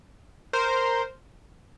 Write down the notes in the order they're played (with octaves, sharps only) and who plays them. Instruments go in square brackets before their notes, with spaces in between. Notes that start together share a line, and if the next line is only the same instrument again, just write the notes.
[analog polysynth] A#4 C5